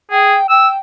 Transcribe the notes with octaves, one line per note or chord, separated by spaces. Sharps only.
G#4 G5
G5 E6